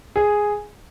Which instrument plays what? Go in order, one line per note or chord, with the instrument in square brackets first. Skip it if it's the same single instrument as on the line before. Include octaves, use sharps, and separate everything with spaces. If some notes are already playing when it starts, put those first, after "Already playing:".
[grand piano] G#4